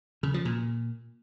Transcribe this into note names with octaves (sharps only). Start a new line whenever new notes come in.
C#3
F3
A#2